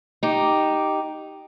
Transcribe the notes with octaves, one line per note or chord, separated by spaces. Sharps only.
D#4 G4